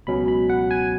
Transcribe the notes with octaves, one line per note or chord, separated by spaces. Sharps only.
C#2 B2 F#3 C#4 B5
B5
F#5
G#5